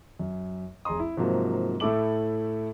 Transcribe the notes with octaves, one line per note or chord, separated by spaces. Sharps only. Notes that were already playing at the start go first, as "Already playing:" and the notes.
F#2
F1 G#4 A#5 C6 D#6
E4
G#2 C3 F3 F#3 A#3
A2 A3 E4 A4 D6 F#7